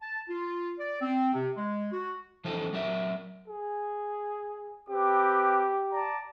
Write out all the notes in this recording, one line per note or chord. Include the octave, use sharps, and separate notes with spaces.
A5
F4
D5
C4
C3
G#3
F#4
E3 F3 D#4 F4 A4 C5
F#3 A#4 D5 E5
G#4
C4 G4 B4 D6
D5 A5 A#5